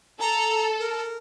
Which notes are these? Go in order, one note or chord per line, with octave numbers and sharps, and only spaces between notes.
A4 A#5
A#4